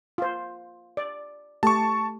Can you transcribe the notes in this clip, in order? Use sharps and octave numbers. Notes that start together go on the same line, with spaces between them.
F4 C5
D5
A3 G4 A5 C#6